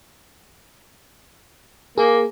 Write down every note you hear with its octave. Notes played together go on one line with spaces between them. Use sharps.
A#3 G#4